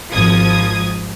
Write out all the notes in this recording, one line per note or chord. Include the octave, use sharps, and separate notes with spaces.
G#1 F3 D#6 G#6